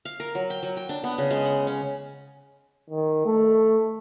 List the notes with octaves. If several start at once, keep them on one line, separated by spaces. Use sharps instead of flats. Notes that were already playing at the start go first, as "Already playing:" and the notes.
F5
A#4
F#3
G5
F#3
G5
D4
B3
C#3
G#3
F#5
C#4
D#3
A3